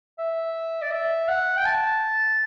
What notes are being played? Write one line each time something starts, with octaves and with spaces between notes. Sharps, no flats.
E5
D5
E5
F#5
G5
A5